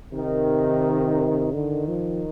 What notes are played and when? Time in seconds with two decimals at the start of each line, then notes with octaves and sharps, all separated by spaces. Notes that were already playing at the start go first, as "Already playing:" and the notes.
0.12 C3 D#3
1.53 D3 D#3
1.88 F3